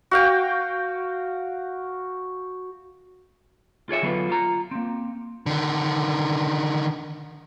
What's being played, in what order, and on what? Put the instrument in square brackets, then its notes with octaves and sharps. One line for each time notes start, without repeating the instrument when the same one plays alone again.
[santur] F#4 F5 G5
[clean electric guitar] F4 G#4 C#5 E5
D3 F#3 B3 F4 B4
F4 A#5
A#3 C4
[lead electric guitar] D3 D#3